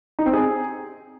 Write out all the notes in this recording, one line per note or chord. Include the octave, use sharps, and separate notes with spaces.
D#4
C4
G#4